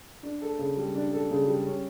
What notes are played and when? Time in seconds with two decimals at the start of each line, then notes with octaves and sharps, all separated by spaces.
0.23 D4
0.41 A4
0.59 C#3
0.77 G3
0.95 D4
1.12 A4
1.31 C#3
1.48 G3
1.65 C#4